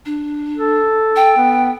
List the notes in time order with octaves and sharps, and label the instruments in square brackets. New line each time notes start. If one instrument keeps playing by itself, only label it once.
[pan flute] D4
[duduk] A4
[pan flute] G5
[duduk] B3